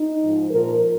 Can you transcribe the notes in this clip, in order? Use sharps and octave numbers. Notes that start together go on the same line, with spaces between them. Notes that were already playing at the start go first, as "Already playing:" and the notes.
Already playing: D#4
G#2 F3
A#2 F3 A#4